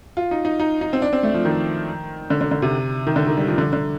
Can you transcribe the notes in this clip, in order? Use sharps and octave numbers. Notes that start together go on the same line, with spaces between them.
F4
D#4
D#4
D#4
D#4
C4
D4
C4
A3
F3
D#3
D3
D3
D3
C3
D#3
D3
D#3
G3
F3
D3
D3